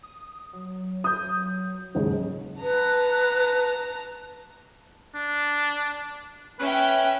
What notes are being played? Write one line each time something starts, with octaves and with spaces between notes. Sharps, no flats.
D#6
F#3
D#6 G6
D#2 G#2 C#3 F#3
B4 A5 A#5
D4
C#4 B4 E5 G5